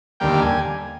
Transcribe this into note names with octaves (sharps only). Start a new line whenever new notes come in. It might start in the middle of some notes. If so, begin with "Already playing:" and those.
D#2 D3 G3 A#3 G5
G#5